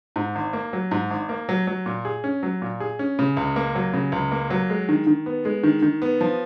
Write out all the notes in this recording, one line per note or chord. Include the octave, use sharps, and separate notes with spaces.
G#2
G#1
A#3
F#3
G#2
G#1
A#3
F#3
F#3
A#2
G#4
C#4
F#3
A#2
G#4
C#4
C#3
C#2
A#3
F#3
C#3
C#2
A#3
F#3
G#3
D#3
D#3
B3
G#3
D#3
D#3
B3
F3